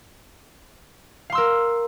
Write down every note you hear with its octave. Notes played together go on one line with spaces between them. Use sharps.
A#4 F5 C6 E6